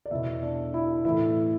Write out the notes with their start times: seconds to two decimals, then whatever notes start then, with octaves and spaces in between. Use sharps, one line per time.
0.06 D5
0.11 E2 B2 E4 E5
0.43 D4 D5
0.74 E4 E5
1.04 A2 E3 E4 E5